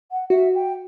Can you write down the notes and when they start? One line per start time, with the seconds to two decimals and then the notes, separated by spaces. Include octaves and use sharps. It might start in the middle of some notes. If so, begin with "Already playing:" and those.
0.11 F#5
0.30 F#4 E5
0.55 G5